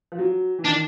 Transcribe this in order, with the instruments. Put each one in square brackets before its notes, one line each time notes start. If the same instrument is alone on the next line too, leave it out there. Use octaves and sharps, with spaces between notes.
[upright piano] F3
F#3
E3
[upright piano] D#3 [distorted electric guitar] D4